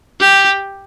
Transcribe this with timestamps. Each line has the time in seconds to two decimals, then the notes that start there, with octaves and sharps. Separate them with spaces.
0.20 G4